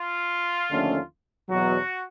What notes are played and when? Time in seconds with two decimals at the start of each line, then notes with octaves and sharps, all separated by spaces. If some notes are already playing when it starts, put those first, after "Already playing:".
Already playing: F4
0.71 D#2 D3 F3 A3 C#4
1.49 E2 B2 F#3 F#4